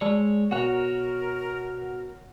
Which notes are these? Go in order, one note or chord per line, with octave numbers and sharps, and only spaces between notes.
G#3 C#5 D5 A5 E6
B2 F#4 A#4 C#5 F#5 F#6